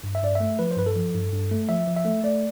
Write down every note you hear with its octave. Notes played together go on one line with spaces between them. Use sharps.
G2
E5
G2 D5
E5
A3
F3 B4
C5
G2 B4
A4
F3
G2
G2
A3
F3 E5
F3
E5
A3
A3 D5